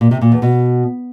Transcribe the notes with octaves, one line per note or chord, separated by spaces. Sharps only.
A#2
C3
A#2
E2
B2